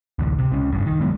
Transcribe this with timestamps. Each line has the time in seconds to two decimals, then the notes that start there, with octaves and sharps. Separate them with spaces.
0.19 A1 D2
0.39 C3
0.52 C#2 C#4
0.72 G#1 G2
0.87 D#3
1.00 D#3 F#3 G#3 B3